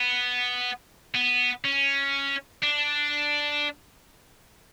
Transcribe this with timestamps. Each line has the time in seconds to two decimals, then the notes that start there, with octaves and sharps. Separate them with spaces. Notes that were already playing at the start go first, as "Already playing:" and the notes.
Already playing: B3
1.14 B3
1.64 C#4
2.63 D4